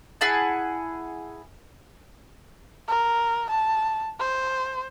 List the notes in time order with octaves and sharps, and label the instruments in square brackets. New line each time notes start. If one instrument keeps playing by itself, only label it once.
[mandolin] E4 G#4 F#5 A5
[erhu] A#4
A5
C5